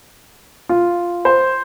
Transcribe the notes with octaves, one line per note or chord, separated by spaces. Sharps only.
F4
C5